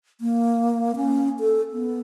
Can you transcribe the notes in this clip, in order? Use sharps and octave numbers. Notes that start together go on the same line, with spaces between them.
A#3
C#4
A4
B3